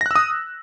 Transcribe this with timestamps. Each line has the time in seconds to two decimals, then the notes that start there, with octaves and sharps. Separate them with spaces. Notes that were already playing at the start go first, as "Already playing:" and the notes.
0.01 A#6
0.06 F#6
0.11 E6
0.16 D#6